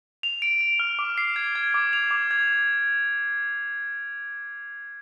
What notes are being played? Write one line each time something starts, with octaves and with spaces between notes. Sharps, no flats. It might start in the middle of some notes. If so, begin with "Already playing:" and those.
F7
D7
D7
F6
D6
C7
G#6
G#6
D6
F7
D6
G#6